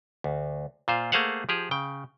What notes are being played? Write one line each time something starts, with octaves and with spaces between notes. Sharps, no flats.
D2
A#2 F4 C5
A3 A#3 G#4 C5 F5 F#5
F3 G4 G#4
C#3 G5